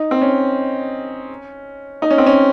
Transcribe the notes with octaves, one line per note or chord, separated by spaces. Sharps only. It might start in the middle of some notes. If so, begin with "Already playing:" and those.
Already playing: D#4
C4
C#4
D#4
C#4
C4
C#4